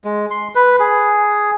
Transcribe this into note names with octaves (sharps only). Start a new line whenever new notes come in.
G#3
C6
B4
G#4